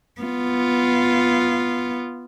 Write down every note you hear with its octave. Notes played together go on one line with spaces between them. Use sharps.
B3 F4